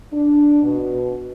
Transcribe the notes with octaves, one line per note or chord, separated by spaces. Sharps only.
D4
B2